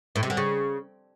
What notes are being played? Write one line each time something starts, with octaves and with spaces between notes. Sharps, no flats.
A2
C3
D3
C#3